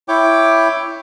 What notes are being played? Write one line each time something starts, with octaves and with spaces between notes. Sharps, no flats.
E4 C#5 G5 D6